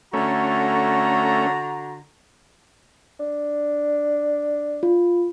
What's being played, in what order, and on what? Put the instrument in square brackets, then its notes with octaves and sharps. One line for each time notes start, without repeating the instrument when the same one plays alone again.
[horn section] D3 F#4 A#5 [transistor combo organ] A3 C#4
[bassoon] D4
[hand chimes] F4